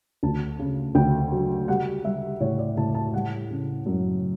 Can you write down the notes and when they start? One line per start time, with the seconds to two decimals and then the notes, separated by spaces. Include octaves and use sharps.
0.23 D2 A5
0.59 C#3
0.95 D2 G5
1.32 F#3
1.68 G3 F#5
2.04 G3 E5
2.40 A2 C#5
2.59 D5
2.77 A2 A5
2.95 A5
3.13 G3 F#5
3.50 C#3
3.86 F#2